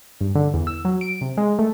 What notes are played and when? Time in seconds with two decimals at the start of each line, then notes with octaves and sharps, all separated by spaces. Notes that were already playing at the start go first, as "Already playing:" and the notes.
0.21 G2
0.35 D3
0.54 E2
0.67 E6
0.85 F#3
1.01 D7
1.21 C3
1.37 G#3
1.59 A3